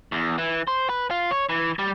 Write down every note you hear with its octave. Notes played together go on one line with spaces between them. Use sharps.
E2
E3
C5
B4
F4
C#5
E3
G3